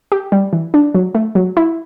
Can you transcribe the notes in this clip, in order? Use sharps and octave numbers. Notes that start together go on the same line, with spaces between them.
G4
G3
E3
D4
F#3
A3
F#3
E4